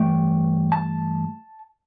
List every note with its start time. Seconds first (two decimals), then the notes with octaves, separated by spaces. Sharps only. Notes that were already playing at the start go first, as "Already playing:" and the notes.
Already playing: G2 E3 A3 G5
0.72 A5